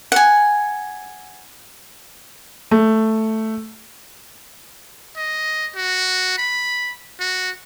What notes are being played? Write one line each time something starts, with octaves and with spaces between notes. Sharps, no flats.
F#5 G#5
A3
D#5
F#4
B5
F#4